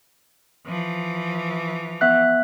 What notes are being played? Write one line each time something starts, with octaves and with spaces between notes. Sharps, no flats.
E3 F3
B3 E5 F#6